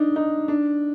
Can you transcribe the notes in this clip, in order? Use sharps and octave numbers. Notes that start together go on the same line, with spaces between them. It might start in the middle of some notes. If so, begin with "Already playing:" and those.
Already playing: D4 D#4
D#4
D4